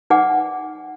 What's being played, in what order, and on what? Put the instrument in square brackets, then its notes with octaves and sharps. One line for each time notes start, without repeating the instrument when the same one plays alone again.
[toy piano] D#4 B4 D5 F#5 G#5 D6